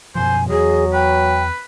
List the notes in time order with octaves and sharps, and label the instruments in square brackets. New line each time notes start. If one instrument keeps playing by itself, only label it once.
[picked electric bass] F#2 B2 F3 [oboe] C5 [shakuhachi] G#5
[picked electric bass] E2 [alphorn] F#3 [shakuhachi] G#4 [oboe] D#5
[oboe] B4 [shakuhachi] G5